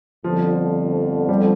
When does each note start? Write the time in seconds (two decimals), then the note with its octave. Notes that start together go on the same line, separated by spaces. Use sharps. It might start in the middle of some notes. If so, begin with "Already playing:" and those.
0.24 G1 F2 D3 F3
1.29 G3